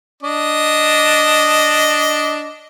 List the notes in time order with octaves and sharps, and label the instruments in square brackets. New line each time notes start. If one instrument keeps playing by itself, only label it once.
[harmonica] D4 D#5